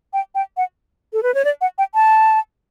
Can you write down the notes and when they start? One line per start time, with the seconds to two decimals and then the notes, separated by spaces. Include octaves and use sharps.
0.13 G5
0.35 G5
0.57 F#5
1.13 A4
1.23 B4
1.34 C#5
1.45 D5
1.61 F#5
1.78 G5
1.95 A5